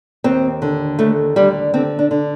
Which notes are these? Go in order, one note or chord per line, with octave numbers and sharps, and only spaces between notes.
D#2 C4
D3
D#2 A3
D3 G3
D3 C4
D4
D3